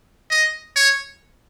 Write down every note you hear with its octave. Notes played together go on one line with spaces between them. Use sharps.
D#5
C#5